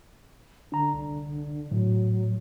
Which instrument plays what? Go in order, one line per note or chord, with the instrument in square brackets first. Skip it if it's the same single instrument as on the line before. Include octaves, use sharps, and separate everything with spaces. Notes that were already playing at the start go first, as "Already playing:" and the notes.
[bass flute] D3 [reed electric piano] D4 A#5
[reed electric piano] C2
[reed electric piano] A2 [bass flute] F#3